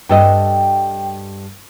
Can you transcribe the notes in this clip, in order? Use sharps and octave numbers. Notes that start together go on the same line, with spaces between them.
G2 A4 D#5 G5